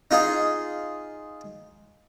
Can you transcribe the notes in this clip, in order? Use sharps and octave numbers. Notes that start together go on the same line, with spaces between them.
D#4 F4 G#4